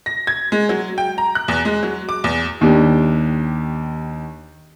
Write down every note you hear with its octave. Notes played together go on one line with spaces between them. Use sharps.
A#6
G#6
G#3
F#3
G5
A#5
F#6
E2
G#3
F#3
D6
E2
D#2 D4 G4